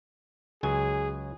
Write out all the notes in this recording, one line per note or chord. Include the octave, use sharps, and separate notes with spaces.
C#2 F#3 G#4 G#5